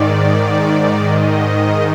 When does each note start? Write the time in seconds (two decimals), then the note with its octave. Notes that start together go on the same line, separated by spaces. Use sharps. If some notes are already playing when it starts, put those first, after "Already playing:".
Already playing: G#2 D#3 D5
1.00 D#5